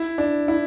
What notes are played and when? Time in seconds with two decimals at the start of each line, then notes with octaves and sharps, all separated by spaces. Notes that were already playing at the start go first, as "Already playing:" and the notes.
Already playing: E4
0.18 D4
0.48 E4